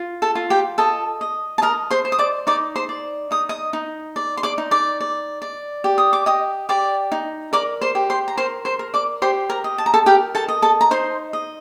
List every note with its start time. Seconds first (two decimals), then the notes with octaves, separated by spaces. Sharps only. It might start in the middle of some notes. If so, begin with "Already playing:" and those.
Already playing: F4
0.22 A4 A5
0.35 F4
0.50 G4 G5
0.78 A4 D#5 A5
1.21 D#5
1.58 A5
1.62 A#4 D#5 A#5
1.91 C5 C6
2.05 C5
2.12 D#6
2.19 D5 D6
2.47 D#4 D5 D6
2.76 C5 C6
2.89 D5
3.31 D#4 D#6
3.49 D#5 D#6
3.73 D#4
4.16 D5
4.37 C6
4.43 D5 D6
4.58 D#4
4.71 D5 D6
5.00 D5
5.42 D5
5.84 G4
5.98 D#6
6.13 D6
6.26 G4 D#5 D#6
6.69 G4 D5 D6
7.12 D#4
7.53 A#4 D5 D6
7.81 C5 C6
7.95 G4
8.10 C5 C6
8.28 A#5
8.37 A#4 C5 C6
8.65 C5 C6
8.79 A#4
8.94 D5 D6
9.22 G4 C5 C6
9.50 A#4 A#5
9.64 D#5
9.78 A5
9.86 A#5
9.94 A4 A5
10.06 G4 A#4 G5
10.35 A4 A5
10.48 D#5
10.62 A4 A5
10.81 A#5
10.91 D#4 C5 C6
11.33 D#5